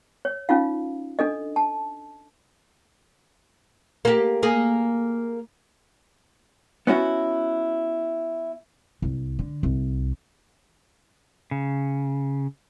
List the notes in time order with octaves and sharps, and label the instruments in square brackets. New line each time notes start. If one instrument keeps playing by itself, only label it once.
[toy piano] C#5
C#4 D#4 F4 F5
D4 A4 D#5
A5
[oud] A#3 G4
A#3 G#4
[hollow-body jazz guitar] B3 C#4 E4 F#4
[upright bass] C2
D3
C2
[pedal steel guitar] C#3